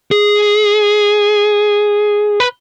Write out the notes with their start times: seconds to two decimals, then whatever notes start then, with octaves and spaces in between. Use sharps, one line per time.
0.11 G#4
2.40 B4